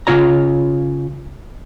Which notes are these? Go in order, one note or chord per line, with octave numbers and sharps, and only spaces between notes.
C#3 F4 C#5 A#5